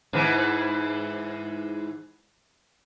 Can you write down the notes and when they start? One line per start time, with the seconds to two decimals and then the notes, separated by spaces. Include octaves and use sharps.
0.13 G#2 E3